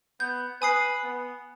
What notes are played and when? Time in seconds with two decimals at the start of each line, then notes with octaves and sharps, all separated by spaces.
0.20 B3 G6
0.62 B4 G#5 D#6 C7
1.03 B3